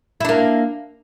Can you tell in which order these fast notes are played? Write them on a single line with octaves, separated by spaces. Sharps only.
E4 D4 A#3